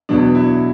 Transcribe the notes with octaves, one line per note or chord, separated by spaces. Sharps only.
E2 B2 F#3 D4
E4